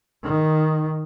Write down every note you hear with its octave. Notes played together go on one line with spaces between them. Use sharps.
D#3